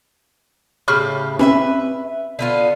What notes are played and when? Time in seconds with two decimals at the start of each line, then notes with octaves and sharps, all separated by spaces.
0.88 A2 C#3 G4 B5 C#6 F6
1.39 C4 C#4 B4 C#5 E5
2.39 D3 B3 F4